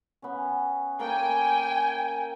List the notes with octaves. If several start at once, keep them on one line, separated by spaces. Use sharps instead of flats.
B3 C#4
A#3 A4 G5 G#5